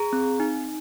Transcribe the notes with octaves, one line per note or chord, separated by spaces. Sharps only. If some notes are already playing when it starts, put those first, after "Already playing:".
Already playing: G#4 A#5
C4
D#4